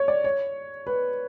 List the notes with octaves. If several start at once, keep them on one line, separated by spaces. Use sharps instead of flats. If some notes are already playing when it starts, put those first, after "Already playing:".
Already playing: C#5
D5
C#5
B4